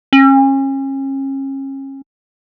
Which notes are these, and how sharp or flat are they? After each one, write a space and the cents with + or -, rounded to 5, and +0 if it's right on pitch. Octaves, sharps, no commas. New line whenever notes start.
C#4 -35